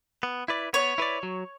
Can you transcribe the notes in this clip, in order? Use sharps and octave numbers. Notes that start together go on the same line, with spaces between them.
B3
E4 B4 D5
B3 C#5
E4 B4 D5
F#3